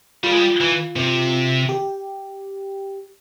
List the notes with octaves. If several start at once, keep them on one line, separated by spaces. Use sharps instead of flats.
G3 F4
G#3
G3
E3
C3
G4